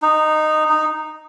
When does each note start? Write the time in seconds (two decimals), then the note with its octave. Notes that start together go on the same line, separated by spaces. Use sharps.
0.02 D#4
0.69 D#4